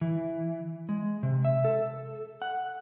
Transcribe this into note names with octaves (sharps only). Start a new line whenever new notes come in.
E3
G#3
C3
E5
A4
F#5